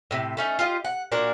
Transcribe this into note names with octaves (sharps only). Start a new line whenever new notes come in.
A2 C3
A3 C#4 D#4
F4 G4 D#5
F#5
A#2 D4 F#4 A#4